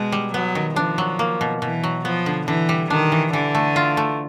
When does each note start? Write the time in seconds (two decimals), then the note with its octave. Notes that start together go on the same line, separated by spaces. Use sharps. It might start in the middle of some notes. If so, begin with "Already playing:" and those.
Already playing: B2 G#3
0.12 G3
0.34 F#3 B3
0.55 D#3
0.76 F3 D4
0.98 F#3
1.19 A#3
1.41 B2
1.62 B2 E3
1.83 F#3
2.05 F3 B3
2.26 D3
2.47 D3 E3
2.69 G3
2.90 D#3 D4
3.12 E3
3.33 D3 E3
3.55 A3
3.76 F4
3.97 A3